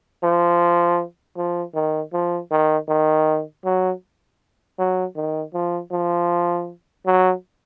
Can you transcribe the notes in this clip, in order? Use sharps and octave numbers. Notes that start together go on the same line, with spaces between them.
F3
F3
D#3
F3
D#3
D#3
F#3
F#3
D#3
F3
F3
F#3